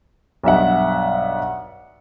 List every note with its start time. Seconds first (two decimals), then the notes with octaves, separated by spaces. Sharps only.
0.43 B1 G2 E5 F#5